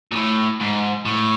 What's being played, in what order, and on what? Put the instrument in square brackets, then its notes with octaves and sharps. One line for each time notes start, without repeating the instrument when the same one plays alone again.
[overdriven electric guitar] A#2
A2
G#2
A2